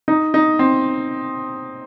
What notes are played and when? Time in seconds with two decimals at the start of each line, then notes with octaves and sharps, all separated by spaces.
0.08 D#4
0.34 D#4
0.59 C4